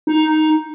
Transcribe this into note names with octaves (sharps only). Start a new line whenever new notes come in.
D#4